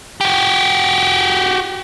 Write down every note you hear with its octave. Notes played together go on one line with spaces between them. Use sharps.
F#4 G4